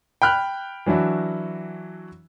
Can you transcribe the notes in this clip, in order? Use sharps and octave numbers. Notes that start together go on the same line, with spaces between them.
G5 B5 F6 F#6
E3 F#3 D4 E4 F#4